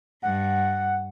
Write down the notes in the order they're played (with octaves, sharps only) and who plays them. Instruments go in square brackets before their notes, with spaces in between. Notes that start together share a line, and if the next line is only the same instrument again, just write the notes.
[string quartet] G2 [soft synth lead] F#5